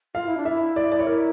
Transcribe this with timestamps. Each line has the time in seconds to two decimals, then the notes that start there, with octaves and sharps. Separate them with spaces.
0.15 F4 F5
0.27 E4
0.37 D4
0.45 E4 E5
0.76 D5
0.92 D5
0.99 C#5
1.07 E4 A#4